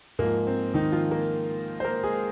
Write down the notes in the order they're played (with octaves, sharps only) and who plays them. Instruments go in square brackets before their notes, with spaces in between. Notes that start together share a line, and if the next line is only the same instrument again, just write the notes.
[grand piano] G#2 F3 A#3
C4
D#3 D#4
F3 F4
A#3 A#4
C5
A#3 A#4
G#3 G#4